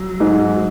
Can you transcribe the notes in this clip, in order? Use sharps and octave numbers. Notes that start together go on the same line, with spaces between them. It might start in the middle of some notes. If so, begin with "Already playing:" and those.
Already playing: F#3
G#2